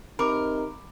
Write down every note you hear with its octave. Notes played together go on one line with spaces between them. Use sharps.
C3 D#4 A#4 B5 D6